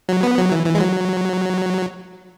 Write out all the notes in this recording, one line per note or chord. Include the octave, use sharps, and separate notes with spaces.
F#3
B3
F#3
E3
E3
G#3
F#3